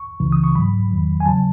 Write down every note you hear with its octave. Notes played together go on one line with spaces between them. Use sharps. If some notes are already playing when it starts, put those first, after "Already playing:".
Already playing: C#6
C#2 C#3 E3
D#6
C#6
G#2 F#3 B5
E2 D#3 F#3
G#5
C#3 F#3 A5